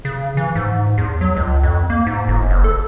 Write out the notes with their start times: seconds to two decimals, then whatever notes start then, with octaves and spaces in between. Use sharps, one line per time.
0.05 C#3
0.37 E3
0.55 G#2
0.98 E2
1.21 F#3
1.36 C#2
1.63 F2
1.90 A#3
2.07 G#2
2.28 G1
2.50 F#1
2.64 A4